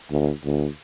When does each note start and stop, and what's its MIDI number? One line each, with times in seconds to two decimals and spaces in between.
0.11 0.32 38
0.45 0.68 38